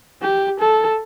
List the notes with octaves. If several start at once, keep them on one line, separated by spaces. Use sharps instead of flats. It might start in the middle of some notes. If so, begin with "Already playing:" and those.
G4
A4